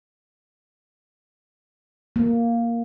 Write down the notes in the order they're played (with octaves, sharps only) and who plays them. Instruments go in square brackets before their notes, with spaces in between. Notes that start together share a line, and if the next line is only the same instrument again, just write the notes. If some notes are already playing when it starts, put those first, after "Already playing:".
[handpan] A#3